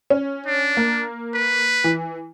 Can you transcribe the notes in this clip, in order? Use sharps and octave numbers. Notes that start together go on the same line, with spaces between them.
C#4
D4
A#3
B4
E3